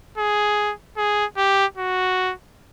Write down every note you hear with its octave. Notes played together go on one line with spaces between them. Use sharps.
G#4
G#4
G4
F#4